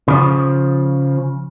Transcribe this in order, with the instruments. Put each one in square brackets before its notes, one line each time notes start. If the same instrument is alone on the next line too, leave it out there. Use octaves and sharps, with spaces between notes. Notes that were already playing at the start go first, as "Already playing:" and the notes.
[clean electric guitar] C#3 F3